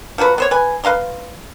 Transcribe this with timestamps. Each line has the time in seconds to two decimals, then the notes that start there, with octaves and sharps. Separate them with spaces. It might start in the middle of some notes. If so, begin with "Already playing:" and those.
0.18 F3 F#3 F#4 B4
0.38 B3 C5 C#5
0.51 B4 G#5
0.84 B4 F5 A#5 C6